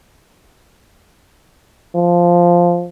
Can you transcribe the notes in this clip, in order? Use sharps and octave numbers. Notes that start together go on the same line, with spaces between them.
F3